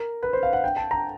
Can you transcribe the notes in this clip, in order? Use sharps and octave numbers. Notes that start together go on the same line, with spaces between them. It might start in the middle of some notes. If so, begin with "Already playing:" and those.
Already playing: A#4
B4
C5
F5
F#5
G5
A5
A#5